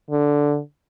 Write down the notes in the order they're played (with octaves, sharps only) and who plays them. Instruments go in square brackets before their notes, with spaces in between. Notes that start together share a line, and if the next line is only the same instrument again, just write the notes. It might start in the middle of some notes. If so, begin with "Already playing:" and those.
[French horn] D3